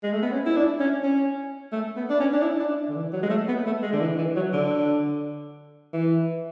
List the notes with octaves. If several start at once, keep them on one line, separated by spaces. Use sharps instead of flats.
G#3
A3
B3
C#4
E4
D4
C#4
C#4
A3
B3
D4
C#4
D4
E4
D4
D3
E3
F#3
G#3
A3
B3
A3
G#3
D3
E3
E3
F#3
D3
E3